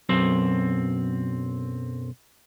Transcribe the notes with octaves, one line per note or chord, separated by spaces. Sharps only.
B1 F#2 C4